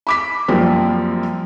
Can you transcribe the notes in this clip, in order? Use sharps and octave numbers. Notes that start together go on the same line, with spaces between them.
B5 D6 B6
F#2 F3 G3 A#3 C4